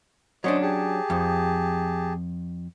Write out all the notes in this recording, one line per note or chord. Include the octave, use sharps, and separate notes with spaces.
F#3 C#4 D4 C5 D#5
G4 G#4 A5
F2